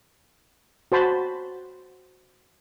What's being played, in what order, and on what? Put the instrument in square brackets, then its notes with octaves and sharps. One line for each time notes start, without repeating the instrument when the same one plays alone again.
[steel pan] F#4 C5 A5 B5